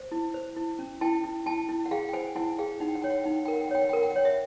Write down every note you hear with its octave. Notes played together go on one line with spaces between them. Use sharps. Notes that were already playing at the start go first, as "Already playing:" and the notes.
Already playing: C5
E4
C5
E4
C#4
E4 G5 A5
E4
E4 G5 A5
E4
F#5
G#4 F5 G5
G5
C5 F#5 G#5
E4 F#5 G#5
G#4 F5 G5
D#4 F#5
G5
F#5
C#5 G5
F#5
G5
D#4 F#5
G5
F#5
G5
A#4
F#5
G5
F#5
C#5 G5
F#5
G5
A#4 F#5
G5
F#5
C#5 G5
E5 F#5